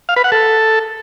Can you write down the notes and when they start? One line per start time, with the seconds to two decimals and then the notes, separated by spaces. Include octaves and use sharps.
0.09 F5
0.16 B4
0.24 F#5
0.32 A4